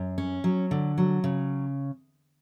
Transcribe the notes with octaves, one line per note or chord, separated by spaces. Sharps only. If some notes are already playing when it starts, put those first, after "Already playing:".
Already playing: F#2
C#4
F#3
D3
F#3
C#3